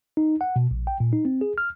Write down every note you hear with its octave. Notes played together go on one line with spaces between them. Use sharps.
D#4
F#5
B2
A#1
G5
A#2
D#4
C4
G#4
F6